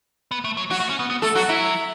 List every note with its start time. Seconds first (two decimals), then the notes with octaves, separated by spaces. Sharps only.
0.31 B3
0.44 A3
0.57 F#3
0.70 F#3 F#4
0.80 A3
0.90 C#4
0.99 B3
1.10 B3
1.22 A3 A4
1.35 F#3 F#4
1.49 F#3 E4